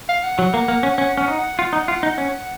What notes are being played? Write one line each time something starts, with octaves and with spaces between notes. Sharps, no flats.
F5
F#5
F#3
A#3
A#3
C#4
C#4 F#5
C#4 F#5
D#4
F#5
F4 F#5
D#4
F4
D#4
C#4